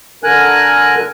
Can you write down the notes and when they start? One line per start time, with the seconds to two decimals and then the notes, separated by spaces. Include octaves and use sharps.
0.24 D3 A#4 G#5 F#6